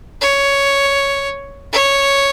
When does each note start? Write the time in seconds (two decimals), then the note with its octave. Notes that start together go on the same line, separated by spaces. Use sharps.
0.21 C#5
1.73 C#5